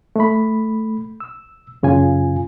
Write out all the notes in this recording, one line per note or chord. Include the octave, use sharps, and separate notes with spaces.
A3 B5
E6
F#2 C#3 F4 G#5